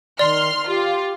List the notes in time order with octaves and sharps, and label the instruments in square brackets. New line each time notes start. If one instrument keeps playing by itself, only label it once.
[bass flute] D#3 [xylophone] D5 [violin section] C6 F6
[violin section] F4 [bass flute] G4